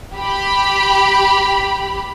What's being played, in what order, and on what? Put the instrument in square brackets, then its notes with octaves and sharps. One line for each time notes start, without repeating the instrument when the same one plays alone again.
[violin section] G4 B5